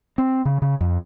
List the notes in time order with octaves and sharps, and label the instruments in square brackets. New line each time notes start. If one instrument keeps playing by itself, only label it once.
[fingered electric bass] C4
C#3
C#3
F2